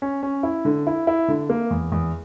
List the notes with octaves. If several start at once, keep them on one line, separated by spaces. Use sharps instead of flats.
C#4
C#4
E4
D3
E4
E4
D3
A#3
E2
E2